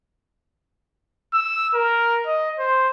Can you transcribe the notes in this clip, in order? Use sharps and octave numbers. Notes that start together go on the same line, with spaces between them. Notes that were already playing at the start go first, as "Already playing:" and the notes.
E6
A#4
D#5
C5